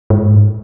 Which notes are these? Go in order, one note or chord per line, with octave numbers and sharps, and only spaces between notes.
G#2